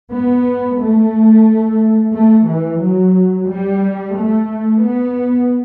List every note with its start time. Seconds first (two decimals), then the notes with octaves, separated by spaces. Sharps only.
0.11 B3
0.78 A3
2.13 A3
2.47 E3
2.81 F#3
3.49 G3
4.16 A3
4.84 B3